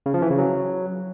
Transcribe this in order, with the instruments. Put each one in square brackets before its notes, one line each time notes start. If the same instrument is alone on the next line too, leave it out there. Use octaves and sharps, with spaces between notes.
[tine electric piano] C#3
F3
E3
C#3
F#3